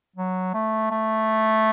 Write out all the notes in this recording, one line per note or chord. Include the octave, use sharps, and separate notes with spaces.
F#3
A3
A3